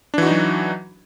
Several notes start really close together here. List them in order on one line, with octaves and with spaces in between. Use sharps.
D4 E3 F#4 D#4 F#3